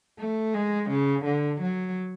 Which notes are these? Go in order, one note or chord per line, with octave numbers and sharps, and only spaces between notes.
A3
G#3
C#3
D3
F#3